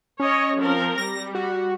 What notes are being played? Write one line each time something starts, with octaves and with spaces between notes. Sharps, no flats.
C#4 C#5 D#5
F3 C4 A#4
G3 A#6
F#4